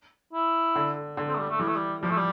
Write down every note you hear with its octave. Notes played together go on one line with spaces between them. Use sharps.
E4
D3
D3
C4
A3
G3
A3
E3 G3
A3
G3
F3 G3
A3
G3